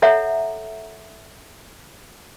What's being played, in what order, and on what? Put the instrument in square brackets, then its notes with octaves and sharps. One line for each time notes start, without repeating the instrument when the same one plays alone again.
[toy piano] A4 C#5 E5 F#5 A#5